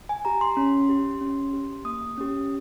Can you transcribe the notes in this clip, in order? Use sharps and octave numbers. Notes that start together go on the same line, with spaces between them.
G#5
G4 A#5
C6
C#4
G4
C#4
G4
A#3 D#6
C#4 G4